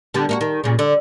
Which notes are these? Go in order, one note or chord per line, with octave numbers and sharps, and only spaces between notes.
D3 G3 B3
A#3 F4 F#4
D#3
A#2 C#3
D3